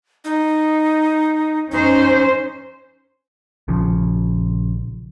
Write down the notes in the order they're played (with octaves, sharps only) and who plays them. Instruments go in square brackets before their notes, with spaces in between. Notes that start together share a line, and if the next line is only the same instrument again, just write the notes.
[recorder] D#4
[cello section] C#4 C5 [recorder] D#4
[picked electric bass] A#1 C#3 F3